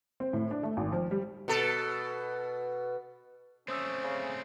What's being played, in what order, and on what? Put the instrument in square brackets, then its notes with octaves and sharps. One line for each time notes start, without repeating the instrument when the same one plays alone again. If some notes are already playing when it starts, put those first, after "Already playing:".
[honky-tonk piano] C4
A2
D4
A3
G#1
F3
G3
[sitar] B2 A4
[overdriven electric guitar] A3 C4 [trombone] C#4 [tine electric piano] C5 D#6 E6
[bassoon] C#3